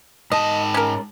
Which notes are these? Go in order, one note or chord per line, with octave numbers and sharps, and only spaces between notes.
G#2 D#5 A5
C#4 A#4